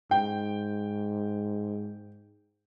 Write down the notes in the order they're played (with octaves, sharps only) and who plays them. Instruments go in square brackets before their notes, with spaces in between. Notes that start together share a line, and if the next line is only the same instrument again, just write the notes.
[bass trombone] G#2 [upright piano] G5